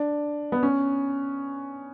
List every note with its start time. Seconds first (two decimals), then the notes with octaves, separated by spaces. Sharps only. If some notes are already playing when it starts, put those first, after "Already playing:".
Already playing: D4
0.52 B3
0.63 C#4